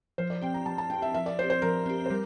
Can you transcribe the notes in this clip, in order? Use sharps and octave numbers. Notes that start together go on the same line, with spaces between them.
F3 C5
D5
C4 G4 G5
A#5
F3 A5
A5
C4 G4 G5
E5
F3 E5
D5
C4 G4 C5
C5
F3 A#4
C4 G4
C5
G3 A#4